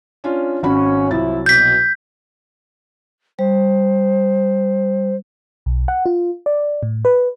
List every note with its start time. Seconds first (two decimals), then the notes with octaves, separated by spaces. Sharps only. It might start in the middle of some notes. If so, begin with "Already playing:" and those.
0.24 C#4 D4 F4
0.63 G#1 C#4 F#4 B5
1.11 C2 F3 F#3 E4 A6
1.46 B2 G6 B6
3.39 G3 C5
5.66 B1
5.88 F#5
6.06 F4
6.46 D5
6.83 A2
7.05 B4